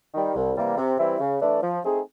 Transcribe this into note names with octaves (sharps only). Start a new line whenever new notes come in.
D#3 G3
C2
C3 E3 G3 A#3
C3
E3 G3 C4 E4
C#3
E3 A3 D4
F3
A3 C4 D#4 G#4